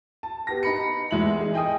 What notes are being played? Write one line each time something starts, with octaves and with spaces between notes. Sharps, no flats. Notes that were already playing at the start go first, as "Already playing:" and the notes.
A5
B3 G4 A#6
D#4 B5 C#7
E2 G#3 E5 F#7
G#4
D#5 G5 G#5 D#6